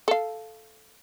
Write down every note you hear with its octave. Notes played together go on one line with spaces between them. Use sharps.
A4 F5